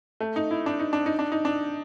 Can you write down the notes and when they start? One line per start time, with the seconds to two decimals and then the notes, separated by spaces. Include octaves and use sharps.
0.20 A3
0.36 D#4
0.51 E4
0.66 D4
0.79 D#4
0.93 D4
1.06 D#4
1.19 D4
1.32 D#4
1.45 D4